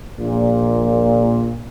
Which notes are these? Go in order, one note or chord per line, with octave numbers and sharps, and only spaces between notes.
A#1 A#2